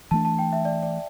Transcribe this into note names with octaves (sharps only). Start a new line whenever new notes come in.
E3 A3 D4 A5
A5
G5
E5
D5
D5